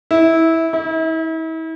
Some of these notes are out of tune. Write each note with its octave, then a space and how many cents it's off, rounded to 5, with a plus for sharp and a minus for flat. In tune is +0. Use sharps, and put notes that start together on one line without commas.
E4 -15
E4 -40